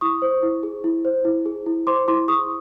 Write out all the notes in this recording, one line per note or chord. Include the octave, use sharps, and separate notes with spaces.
E4 C#6 D#6
C5
E4
G#4
E4
C5
E4
G#4
E4
C5 C6 D6
E4 C6 D6
G#4 C#6 D#6